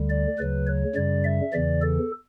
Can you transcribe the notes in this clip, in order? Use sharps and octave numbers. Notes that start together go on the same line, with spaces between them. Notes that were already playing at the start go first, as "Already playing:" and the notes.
Already playing: D2 D3 G3
D5
D2 C#3 F#3 B4
C#5
F#2 C#3 G3 D5
E5
E2 C#3 E3 D5
A4